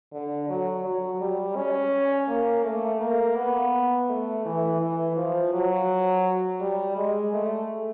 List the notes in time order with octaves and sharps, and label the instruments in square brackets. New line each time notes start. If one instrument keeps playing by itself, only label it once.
[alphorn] D3
F#3
F#3
G3
C#4
A#3
A3
A#3
B3
A3
E3
E3
F3
F#3
G3
G#3
A3